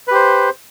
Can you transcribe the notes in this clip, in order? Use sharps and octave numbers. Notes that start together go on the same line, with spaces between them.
G4 B4 C5